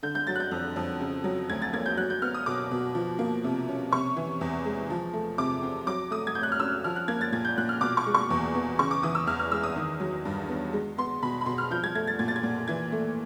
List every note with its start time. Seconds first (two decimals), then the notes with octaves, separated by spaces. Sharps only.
0.03 D3 G6
0.15 G6
0.27 F#3 A6
0.35 F#6
0.40 G6
0.51 F2
0.76 F2
1.01 C#3
1.24 F#3
1.49 D2 G#6
1.62 A6
1.73 A#3 G#6
1.86 G6
1.97 F#3 F#6
2.10 G6
2.22 B3 F6
2.34 D#6
2.46 B2 D6
2.71 B2
2.95 F3
3.19 A#3
3.44 C3
3.68 C#4
3.92 C3 C#6
4.16 E3
4.41 E2
4.65 G#3
4.90 F3
5.13 A3
5.38 C3 D6
5.63 C4
5.87 F#3 D6
6.11 A3 D#6
6.27 G#6
6.35 A2 G6
6.43 F#6
6.52 F6
6.60 C#4 E6
6.84 F3 F6
6.96 F#6
7.08 A#3 G#6
7.21 A6
7.32 A#2 G#6
7.45 G6
7.58 A#2 F#6
7.69 F6
7.81 B2 D6
7.97 C#6
8.06 G#3
8.14 C#6
8.30 E2
8.55 B3
8.79 C#3 C#6
8.91 D6
9.03 E3 D#6
9.15 E6
9.27 E2 F6
9.39 F6
9.52 G#3 E6
9.63 D#6
9.76 D#3
10.00 F#3
10.25 G2
10.49 B3
10.73 G#3
10.98 B3 C6
11.22 B2 B5
11.41 B5
11.46 B2 C6
11.58 F6
11.71 F3 G6
11.84 G#6
11.95 A3 G#6
12.07 A6
12.19 A#2 G#6
12.28 A6
12.36 G#6
12.43 A#2
12.68 E3 G#6
12.92 A3